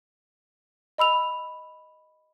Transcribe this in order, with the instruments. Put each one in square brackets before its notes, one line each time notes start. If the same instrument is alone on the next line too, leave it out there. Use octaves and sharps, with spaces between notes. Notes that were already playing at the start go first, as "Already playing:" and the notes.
[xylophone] D#5 B5 E6 F7